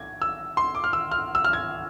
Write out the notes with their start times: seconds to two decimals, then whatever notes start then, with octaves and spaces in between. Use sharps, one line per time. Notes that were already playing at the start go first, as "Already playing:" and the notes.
Already playing: G#6
0.22 E6
0.57 C6
0.75 D6
0.84 F6
0.93 E6
1.11 F6
1.35 E6
1.45 F6
1.53 G#6